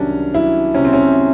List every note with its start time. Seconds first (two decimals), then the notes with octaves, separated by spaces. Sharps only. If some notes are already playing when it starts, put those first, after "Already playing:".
Already playing: C2 D#3 F#3 C#4 D4
0.33 F#3 E4
0.74 C3 C#4
0.85 C4
0.93 C#4